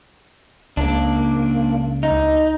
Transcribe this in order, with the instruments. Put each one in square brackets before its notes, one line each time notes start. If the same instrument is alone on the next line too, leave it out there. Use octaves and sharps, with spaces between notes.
[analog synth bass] C#2 [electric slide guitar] A#3 D4
[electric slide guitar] D#4